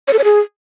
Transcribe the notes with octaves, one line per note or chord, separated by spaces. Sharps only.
C#5
A4
C#5
G#4